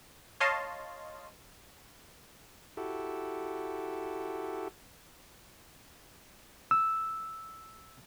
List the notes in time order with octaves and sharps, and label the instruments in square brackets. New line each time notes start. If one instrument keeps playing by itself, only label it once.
[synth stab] C#5 D#5 F5 A5 C6
[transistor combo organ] E4 F#4 G4 A4
[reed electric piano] E6